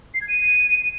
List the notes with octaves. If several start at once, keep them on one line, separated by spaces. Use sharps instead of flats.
C7
G#6
D#7